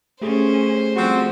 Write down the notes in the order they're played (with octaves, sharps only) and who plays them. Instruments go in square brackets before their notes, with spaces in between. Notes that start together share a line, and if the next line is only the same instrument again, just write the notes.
[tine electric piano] A3 G4 G#4 [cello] C#4 [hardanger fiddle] C5
[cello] F3 G3 [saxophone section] C4 F#4